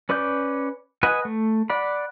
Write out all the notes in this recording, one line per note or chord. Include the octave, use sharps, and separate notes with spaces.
C#4 B4 D5 D6 G6
B4 D#5 F#5 G#5
A3
D5 F#5 B5